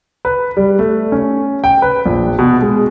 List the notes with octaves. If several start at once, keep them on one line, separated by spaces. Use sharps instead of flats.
B4
G3
A3
C#4
G5
B4
A#1
B2
G#3